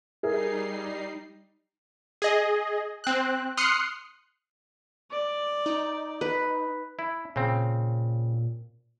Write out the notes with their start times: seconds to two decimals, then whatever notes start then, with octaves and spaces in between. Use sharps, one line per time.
0.23 G3 D#4 G#4 A#4 E5 C7
2.22 G#4 D#5
3.04 C4 F#6
3.57 C6 D#6 F6 F#6 C7 C#7
5.11 D5
5.66 D#4
6.21 B4
6.99 E4
7.36 A#2 C#3 C4